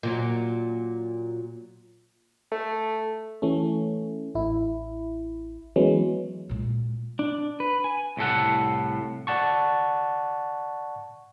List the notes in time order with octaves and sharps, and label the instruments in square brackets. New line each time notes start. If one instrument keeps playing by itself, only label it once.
[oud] A#2 F#3
[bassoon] A3
[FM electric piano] E3 A3 C#4
A1 E4
E3 F#3 G#3 B3 C#4
[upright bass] A#2 G#3
[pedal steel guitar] D4
B4
G#5
[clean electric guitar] C2 A2 A4 F#5
[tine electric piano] D5 F#5 A5 C#6